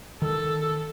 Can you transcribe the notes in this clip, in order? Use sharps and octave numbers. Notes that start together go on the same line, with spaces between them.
D#3 A4